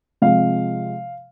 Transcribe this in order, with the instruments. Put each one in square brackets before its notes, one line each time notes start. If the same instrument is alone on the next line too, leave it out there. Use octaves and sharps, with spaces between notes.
[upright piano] C3 F3 G#3 F5